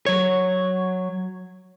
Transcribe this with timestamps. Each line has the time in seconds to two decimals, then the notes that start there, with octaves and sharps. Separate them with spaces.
0.06 F#3 C#5